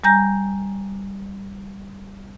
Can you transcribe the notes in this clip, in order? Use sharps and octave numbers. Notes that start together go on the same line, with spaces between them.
G3 G#5 A#5 G6 A#6